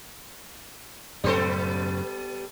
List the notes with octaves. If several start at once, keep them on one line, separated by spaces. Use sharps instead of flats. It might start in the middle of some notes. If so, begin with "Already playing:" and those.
F#2 A2 C#3 G3 B3 A4